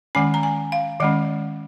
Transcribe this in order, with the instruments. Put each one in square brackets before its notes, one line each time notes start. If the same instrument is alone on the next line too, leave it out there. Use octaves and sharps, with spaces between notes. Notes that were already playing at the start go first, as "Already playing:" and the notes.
[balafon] D#3 G#3 C#4 G#5
A#5
G#5
F5
D#3 G#3 C#4 D#5